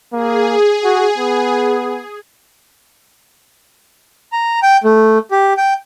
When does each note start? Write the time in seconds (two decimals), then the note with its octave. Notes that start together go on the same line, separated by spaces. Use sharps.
0.13 A#3 G#4
0.84 F#4
1.18 B3
4.32 A#5
4.63 G5
4.84 A3
5.31 G4
5.57 G5